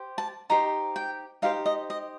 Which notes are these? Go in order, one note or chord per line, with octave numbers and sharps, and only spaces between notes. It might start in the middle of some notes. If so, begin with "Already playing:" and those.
Already playing: G4 C5
A5
D#4 G4 C5 A#5
G5
D#4 G4 C5 F5
D#5
D#5